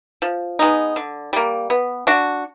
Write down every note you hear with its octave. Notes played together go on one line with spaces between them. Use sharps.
F3
G#3 B3 D#4
D3
G3 A#3
B3
D4 F#4